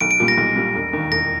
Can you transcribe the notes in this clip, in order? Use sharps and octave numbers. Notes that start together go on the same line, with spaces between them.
B1 D7
D7
A#2 G3
A#6
B1
A#2 G3
E1
D#2 D#3
E1 A#6